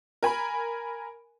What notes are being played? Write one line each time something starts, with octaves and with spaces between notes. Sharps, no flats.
A#4 G#5 B5